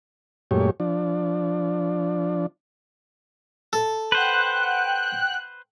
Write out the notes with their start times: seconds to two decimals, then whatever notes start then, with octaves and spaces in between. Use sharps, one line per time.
0.51 F#2 A#2 G#3 A3 G4 C#5
0.80 F3 D4
3.73 A4
4.12 B4 C5 F#5 G5 F#6